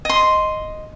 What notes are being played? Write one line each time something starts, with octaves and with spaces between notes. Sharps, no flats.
D#5 C6